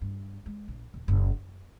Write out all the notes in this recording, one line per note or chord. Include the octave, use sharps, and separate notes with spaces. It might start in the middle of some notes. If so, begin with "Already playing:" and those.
G2
G#3
A#1
D#1
F#1 A#2
F#2